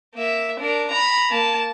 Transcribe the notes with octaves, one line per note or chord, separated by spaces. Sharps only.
A#3 E5
D4 A#4
A#5 B5
A#3 A5